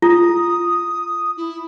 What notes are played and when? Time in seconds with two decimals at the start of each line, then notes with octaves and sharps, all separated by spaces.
0.02 F4 D#6
1.36 E4